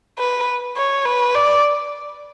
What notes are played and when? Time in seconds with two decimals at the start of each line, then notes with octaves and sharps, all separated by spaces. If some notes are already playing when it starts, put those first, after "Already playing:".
0.19 B4
0.76 C#5
1.06 B4
1.35 D5